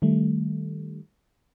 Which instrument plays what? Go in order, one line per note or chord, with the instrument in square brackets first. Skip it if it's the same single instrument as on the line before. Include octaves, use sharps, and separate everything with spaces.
[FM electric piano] D#3 G3 A3